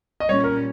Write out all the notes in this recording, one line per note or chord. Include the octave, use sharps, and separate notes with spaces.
D#5
A#2 G3 C#4 C#5
A#4